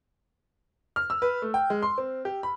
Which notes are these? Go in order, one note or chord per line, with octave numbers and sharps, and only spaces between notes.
F6
E6
B4
A3
G5
G#3
C6
C4
G4
B5